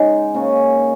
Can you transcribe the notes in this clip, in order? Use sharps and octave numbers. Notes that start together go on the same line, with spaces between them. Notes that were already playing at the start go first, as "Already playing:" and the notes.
Already playing: C#3 G#3 D#4
C#3 A#3 C#4